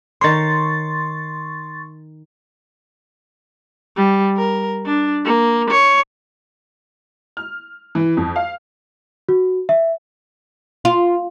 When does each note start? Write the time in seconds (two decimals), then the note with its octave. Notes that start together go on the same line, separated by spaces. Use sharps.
0.21 D#3 C#5 C6 C#6 A6
3.97 G3
4.37 A#4
4.86 D4
5.25 A#3
5.70 C#5
7.37 F6
7.95 E3
8.17 F2
8.36 F5
9.29 F#4
9.69 E5
10.85 F4